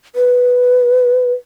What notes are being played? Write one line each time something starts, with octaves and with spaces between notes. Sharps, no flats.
B4